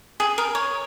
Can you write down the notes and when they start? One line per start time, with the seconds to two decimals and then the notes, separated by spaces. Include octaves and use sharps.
0.20 G#4
0.38 A#4
0.55 C#5